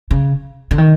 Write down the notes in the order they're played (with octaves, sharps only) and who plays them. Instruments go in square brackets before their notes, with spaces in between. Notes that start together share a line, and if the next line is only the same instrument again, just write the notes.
[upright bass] C#3
D3
D#3